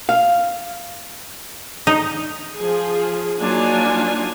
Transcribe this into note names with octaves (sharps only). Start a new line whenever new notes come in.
F5
D#4
F3 G#4
F#3 A#3 D4 D#4 F4 G#5